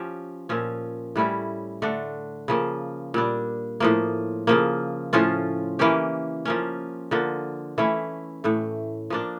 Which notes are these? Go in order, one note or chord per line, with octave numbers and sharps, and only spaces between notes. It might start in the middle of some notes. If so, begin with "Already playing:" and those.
Already playing: F3 C#4 G4
A#2 F3 C#4
A2 G3 C#4 E4
D3 A3 D4
C#3 F3 A#3
A#2 G3 D4
A2 F3 A#3
C#3 F3 A#3
A2 F3 C#4 F4
E3 A#3 C#4 G4
F3 A#3 C#4
D3 F3 A#3
E3 A3 C#4 E4
A2 E3 A3
F3 A#3 D4